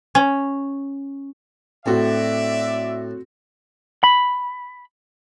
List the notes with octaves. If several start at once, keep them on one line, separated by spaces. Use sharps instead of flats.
C#4
A2 C4 F#4 D5 E5
B5